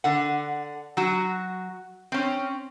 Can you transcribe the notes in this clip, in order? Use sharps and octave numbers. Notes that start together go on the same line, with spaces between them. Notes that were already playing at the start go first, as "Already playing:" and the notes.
D3 F#5
F#3 F#4
C4 C#4